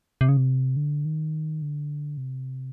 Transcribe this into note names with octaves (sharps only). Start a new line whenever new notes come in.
C3
C#3
C3
D3
D#3
D3
C3